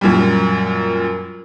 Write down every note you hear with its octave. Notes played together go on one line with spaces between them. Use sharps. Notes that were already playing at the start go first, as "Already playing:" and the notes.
F#2 A#2 G3